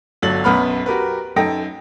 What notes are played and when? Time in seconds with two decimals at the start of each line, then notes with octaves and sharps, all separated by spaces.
0.22 G1 F#3 A4 A6 F#7
0.44 B1 F#2 B3 B5 F6
0.86 F#4 G4 A#4 B4
1.36 F#2 D#4 A4 G5 A#6